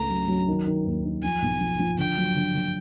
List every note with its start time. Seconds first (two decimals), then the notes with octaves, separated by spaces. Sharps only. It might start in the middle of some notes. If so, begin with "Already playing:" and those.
Already playing: C#2 A3 A#5
0.10 F#3
0.28 F#3
0.48 D#3
0.67 D#3
0.86 D#2
1.05 D#3
1.23 F3 G#5
1.42 B1
1.61 F3
1.79 F3
1.98 D3 G5
2.17 F#3
2.36 D3
2.55 D3